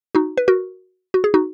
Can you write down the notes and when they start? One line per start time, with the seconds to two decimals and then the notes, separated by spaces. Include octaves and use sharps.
0.15 D#4 F#4
0.37 B4
0.48 F#4 A#4
1.14 F#4
1.24 G#4
1.34 D#4 F#4